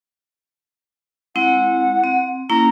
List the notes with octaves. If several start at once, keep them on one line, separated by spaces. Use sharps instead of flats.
G#3 C4 E4 F#5
C4
A#3 C#4 E4 A#5